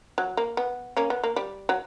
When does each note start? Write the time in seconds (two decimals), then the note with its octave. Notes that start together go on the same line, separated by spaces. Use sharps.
0.18 F#3
0.37 A#3
0.57 B3
0.97 A#3 C#4
1.10 B3
1.24 A#3
1.36 G3
1.69 F#3